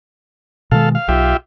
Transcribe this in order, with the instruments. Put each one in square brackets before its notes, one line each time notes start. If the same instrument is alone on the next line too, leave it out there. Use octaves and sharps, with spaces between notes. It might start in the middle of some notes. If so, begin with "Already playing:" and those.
[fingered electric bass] B2 D#3 G#3 [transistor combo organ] A4 F5
[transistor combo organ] F5
[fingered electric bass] B1 [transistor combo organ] F4 G4 E5